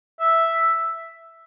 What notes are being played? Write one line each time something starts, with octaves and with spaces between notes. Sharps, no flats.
E5